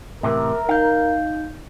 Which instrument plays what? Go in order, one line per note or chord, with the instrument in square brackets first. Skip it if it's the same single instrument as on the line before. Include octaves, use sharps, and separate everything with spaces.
[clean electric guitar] A2 C3 E3 [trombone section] A#4 [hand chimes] E5
[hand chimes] D#4 G6 [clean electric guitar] F5